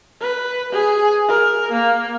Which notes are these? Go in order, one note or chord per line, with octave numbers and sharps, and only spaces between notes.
B4
G#4
A#4
A#3